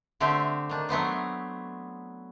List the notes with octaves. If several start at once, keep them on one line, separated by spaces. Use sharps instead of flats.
D3 A3 C4 G4 E5
D#3 D4
F#3 A3 B3 C4